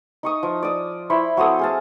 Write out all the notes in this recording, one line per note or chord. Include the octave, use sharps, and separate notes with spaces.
D#4 C#6 D#6
F3
D5 D#6
E4 C5 B5 C#6
F#3 C4 A4 D#6
G#4 F5 A5